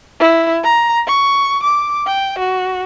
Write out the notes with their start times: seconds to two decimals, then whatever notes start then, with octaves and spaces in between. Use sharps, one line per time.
0.20 E4
0.63 A#5
1.07 C#6
1.63 D6
2.07 G5
2.39 F#4